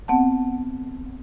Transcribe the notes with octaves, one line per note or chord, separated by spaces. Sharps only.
B3 C4 F#5 A5